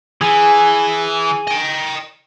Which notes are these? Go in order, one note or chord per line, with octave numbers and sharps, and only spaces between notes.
E3 G#4
D#5 G5